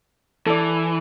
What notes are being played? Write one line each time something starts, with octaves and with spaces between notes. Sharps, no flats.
E3 A4 D5